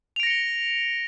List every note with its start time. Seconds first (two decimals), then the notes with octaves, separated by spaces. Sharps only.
0.16 F7
0.20 D7
0.23 A#6
0.27 C#7
0.30 G7